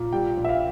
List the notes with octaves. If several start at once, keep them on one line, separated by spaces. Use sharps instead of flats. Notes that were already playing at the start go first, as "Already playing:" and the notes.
Already playing: A#2
G3 G5
A#1
E5
F5